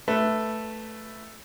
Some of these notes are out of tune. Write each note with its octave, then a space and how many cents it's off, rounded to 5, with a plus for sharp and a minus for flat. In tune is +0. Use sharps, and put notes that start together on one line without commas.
A3 +0 B4 +0